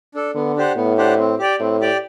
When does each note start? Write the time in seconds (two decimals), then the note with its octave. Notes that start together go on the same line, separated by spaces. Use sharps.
0.15 D4 A4
0.35 D3 B3
0.56 D4 G4 C5 F#5
0.76 A2 B3
0.98 D4 G4 C5 F#5
1.19 C4
1.39 G4 D5 G5
1.60 A2 C4
1.81 G4 D5 G5